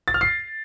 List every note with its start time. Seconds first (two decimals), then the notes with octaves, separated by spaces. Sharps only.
0.08 A6
0.14 F6
0.21 C7